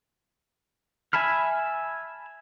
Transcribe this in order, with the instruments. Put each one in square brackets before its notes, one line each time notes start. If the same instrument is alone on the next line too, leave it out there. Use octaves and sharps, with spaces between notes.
[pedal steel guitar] E5 G#5 A5 B5 F6